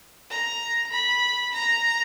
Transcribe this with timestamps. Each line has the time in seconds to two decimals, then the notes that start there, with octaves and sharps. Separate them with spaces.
0.30 A#5
0.93 B5
1.54 A#5